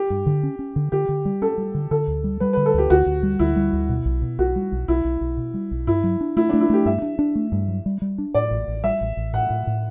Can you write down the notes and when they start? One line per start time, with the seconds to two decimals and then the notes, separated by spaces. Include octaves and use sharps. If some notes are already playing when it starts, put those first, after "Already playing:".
Already playing: G4
0.10 G2
0.26 D3
0.43 C#4
0.59 C#4
0.76 D3
0.92 D3 G4
1.09 D3
1.25 G3
1.42 C#4 A4
1.58 G3
1.75 D3
1.91 D3 A4
2.07 D2
2.24 G3
2.40 G3 B4
2.53 D3 B4
2.66 A4
2.74 D2 G4
2.90 D2 F#4
3.06 D2
3.23 G3
3.39 D2 E4
3.56 G3
3.73 D2
3.89 B2
4.05 B1
4.22 B2
4.38 B1 F#4
4.56 G3
4.72 B1
4.88 B1 E4
5.05 B1
5.21 B1
5.37 B2
5.54 G3
5.71 B1
5.87 G2 E4
6.04 F#3
6.21 D4
6.36 A3 E4
6.49 A3 D4
6.61 E4
6.70 A3 G4
6.86 G2 E5
7.02 D4
7.19 D4
7.35 A3
7.52 G2
7.68 F#3
7.86 G3
8.02 G3
8.18 D4
8.34 A2 D5
8.51 A1
8.68 A1
8.84 G3 E5
9.01 A1
9.17 A1
9.33 A2 F#5
9.50 A2
9.67 A2